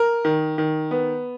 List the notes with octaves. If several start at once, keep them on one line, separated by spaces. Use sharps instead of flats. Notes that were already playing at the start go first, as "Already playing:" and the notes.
Already playing: A#4
D#3
D#3
B3